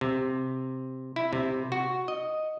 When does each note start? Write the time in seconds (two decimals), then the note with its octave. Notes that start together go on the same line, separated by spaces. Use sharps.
0.01 C3
1.16 E4
1.33 C3
1.72 F#4
2.08 D#5